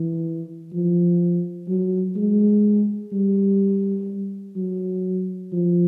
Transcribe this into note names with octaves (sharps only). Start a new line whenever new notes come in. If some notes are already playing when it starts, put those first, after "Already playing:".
Already playing: E3
F3
F#3
G#3
G3
F#3
F3